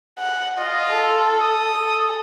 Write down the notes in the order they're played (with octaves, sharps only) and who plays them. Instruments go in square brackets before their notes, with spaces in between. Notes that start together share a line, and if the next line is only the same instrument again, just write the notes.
[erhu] F#5
[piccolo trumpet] F4 [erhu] D#5
[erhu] A4
[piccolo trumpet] D#6
[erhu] A4